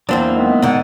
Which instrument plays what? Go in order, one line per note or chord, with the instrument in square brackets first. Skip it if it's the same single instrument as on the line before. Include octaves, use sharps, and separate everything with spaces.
[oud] E2 C4 D4 [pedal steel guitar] F#3 A#3 E4
[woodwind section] D#3 G#3 B3
[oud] G#2 D3